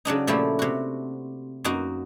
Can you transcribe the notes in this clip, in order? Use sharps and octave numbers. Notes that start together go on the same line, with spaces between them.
C#3 F#3 D4 D#4
A#2 F3 A3 E4 G4
C3 F#4
F#2 A#3 D#4 F#4